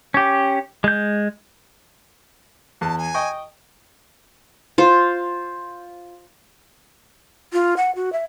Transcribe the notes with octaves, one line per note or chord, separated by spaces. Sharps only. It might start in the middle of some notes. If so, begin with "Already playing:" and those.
C#4 G4
G#3 G6
E2 A5
G#5
D#5 G5 C#6
F4 C5
F4
F#5
F#4
E5